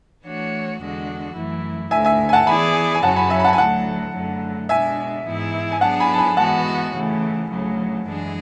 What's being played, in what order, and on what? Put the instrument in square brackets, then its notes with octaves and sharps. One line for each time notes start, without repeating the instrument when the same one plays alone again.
[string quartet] E3 A3 D4 F#4 C#5
E2 D3 G#3 D4 F#4
F#2 E3 A3 E4
[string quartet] D2 D3 A3 [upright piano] E5 G#5
[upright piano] E5 G#5
G#5
F#5 A5
[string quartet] E3 B3 E4 G#4 D5 [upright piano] G#5 B5
[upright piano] G#5
[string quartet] F#2 C#3 F#3 C#4 F#4 [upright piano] F#5 A5
[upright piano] G#5 B5
E5 G#5
B5
F#5 A5
G#5
[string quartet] D2 D3 F#3 A3 [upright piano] F#5 A5
[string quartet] F#2 D3 F#3 A3
[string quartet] B2 G#3 D4 [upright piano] E5 G#5
[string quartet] G#2 E3 B3 E4 G#4
[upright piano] G#5
[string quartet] F#3 B3 D4 G#4 [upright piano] F#5 A5
[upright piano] G#5 B5
A5
G#5 B5
[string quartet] E3 G#3 B3 F#4 [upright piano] F#5 A5
[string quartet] C#3 E3 A3
D2 C#3 F#3 A3
F#2 E3 G#3 D4 G#4